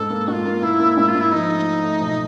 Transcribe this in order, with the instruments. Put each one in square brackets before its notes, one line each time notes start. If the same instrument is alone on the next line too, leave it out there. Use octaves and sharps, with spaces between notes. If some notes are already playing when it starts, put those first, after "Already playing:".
Already playing: [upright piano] G#2 [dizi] A4
[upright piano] A#3
[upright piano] G#2 [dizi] F4 F#4
[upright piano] A#3
[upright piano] A#3 [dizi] E4
[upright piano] A#3
G#2
[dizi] F4
[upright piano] G#2
[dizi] E4
[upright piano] F3 [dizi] D#4
[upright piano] A3
A3
A3
B1